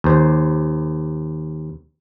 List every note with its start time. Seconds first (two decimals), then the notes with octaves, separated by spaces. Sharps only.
0.04 D#2 C5